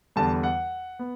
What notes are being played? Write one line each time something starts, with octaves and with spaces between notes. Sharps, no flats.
E2 D3 G3 A5
F#5
B3